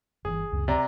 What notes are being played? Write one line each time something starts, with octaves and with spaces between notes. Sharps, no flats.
G1 E3 G#4
C#2 F#2 C#3
C3 D5 A#5